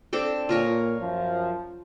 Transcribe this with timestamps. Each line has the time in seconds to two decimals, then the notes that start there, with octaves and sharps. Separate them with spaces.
0.13 C4 D4 A4
0.49 A#2 F4 A#4 C#5
0.99 F#2 F3